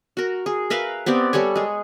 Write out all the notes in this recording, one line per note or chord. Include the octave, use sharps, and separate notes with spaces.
F#4 A#4
G#4
A#4 B4 E5 F5
B3 C4 G4 D5
G3 A4 C#5 G#5
G#3 G#4